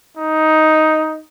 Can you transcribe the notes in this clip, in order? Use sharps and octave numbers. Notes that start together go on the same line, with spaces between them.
D#4